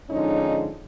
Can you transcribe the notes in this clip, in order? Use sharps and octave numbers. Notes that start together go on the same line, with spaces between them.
G#2 D3 F3 G#3 C#4 D#4